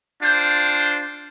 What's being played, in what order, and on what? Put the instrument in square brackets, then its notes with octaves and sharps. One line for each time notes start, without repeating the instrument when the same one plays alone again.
[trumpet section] D4 F4 C5 G5